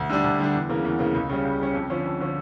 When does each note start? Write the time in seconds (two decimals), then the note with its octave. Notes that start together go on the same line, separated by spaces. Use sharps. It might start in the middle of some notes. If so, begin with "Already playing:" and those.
Already playing: D2
0.09 D3 G3 D4
0.24 D2
0.39 D3 G3 D4
0.54 E2
0.69 C#3 E3 A#3
0.85 E2
0.99 C#3 E3 A#3
1.15 C#2
1.29 C#3 G3 C#4
1.45 C#2
1.60 C#3 G3 C#4
1.75 F2
1.89 D3 F3 C#4
2.05 F2
2.20 D3 F3 C#4